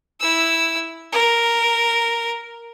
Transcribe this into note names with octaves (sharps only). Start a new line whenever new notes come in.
E4 E6
A#4